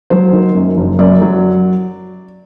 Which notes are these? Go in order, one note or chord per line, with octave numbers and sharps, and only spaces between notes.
F#3 C5
D#3
F#2
F#1
F#2 D5
F#3